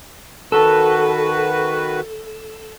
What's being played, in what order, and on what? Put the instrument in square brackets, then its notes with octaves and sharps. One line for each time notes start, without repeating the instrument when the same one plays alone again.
[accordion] D#3 F#4 B4 [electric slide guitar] A4